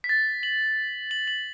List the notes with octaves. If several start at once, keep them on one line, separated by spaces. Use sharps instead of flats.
B6
A6
F#7
F#7
F#7